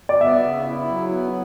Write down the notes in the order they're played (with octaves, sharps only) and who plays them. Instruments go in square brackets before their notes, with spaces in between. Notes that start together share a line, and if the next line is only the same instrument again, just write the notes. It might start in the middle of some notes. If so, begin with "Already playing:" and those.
[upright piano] D5
[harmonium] B3 [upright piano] E5
[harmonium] C#3
E4
F#3
B3